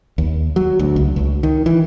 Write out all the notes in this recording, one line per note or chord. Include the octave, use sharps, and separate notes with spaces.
D#2
F#3
D2
C#2
C#2
D#3
E3